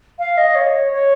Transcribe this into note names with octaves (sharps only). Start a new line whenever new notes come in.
F5
D#5
C#5
C#5